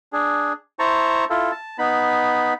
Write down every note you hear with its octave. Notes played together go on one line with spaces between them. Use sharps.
D4 G#4
E4 C5 A5 A#5 C#6
E4 F4 A4
A5
B3 D#4 B5